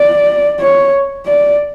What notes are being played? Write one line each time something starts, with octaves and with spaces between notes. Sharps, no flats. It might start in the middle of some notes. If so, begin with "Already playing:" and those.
Already playing: D5
C#5
D5